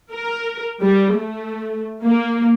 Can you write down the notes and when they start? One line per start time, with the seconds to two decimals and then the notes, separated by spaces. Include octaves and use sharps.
0.11 A#4
0.80 G3
1.14 A3
2.03 A#3